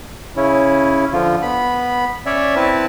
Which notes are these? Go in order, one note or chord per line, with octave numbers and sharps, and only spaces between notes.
C#3 C#4 E4
D3 F3 F4
B3 B5
C#4 C#5 D5 E5
C4 E4 B4 A5